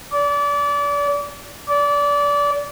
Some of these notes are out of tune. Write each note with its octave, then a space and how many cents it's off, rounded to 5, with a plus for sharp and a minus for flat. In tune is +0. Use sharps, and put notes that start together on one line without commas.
D5 -30
D5 -25